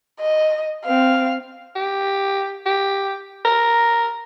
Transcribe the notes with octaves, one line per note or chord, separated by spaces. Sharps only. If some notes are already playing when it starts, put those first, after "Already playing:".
D#5
C4 F5
G4
G4
A#4